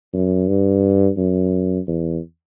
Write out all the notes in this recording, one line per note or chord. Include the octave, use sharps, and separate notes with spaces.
F#2
G2
F#2
E2